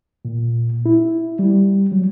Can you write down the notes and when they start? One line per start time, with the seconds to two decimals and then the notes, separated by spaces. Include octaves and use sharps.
0.25 A#2
0.86 E4
1.39 G3
1.92 F#3